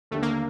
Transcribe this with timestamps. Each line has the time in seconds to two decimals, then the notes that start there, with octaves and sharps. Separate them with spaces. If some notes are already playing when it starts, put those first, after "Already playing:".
0.11 D#2 D3 G3 A3 D4
0.22 A#3